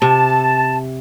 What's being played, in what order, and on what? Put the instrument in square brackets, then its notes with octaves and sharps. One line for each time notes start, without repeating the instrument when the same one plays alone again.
[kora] C3 [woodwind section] A5